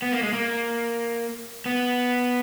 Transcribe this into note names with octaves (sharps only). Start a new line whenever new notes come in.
B3
A#3
G#3
A#3
B3